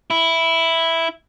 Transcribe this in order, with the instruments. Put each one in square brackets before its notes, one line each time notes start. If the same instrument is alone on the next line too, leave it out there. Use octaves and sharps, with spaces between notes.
[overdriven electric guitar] E4